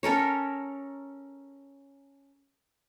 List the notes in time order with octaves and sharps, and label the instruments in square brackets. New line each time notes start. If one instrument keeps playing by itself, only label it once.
[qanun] C#4 A4 A#4 C#5